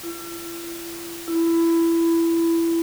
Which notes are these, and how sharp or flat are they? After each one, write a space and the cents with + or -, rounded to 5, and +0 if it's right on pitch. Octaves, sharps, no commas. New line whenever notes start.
E4 +45
E4 +15